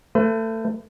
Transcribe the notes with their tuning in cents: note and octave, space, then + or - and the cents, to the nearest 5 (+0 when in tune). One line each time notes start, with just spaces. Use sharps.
A3 +25 B4 +35